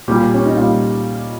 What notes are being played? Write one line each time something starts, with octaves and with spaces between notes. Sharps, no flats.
A#2 G3 G4
C#4
D#4
A#2 G3 F4